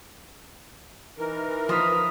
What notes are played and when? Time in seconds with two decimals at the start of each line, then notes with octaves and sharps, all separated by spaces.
1.18 E3 D#4 A#4
1.69 F3 B4 D#6 F6 B6